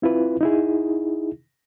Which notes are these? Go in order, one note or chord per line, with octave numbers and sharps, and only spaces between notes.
C4 E4 F4 B4
D#4 E4 G#4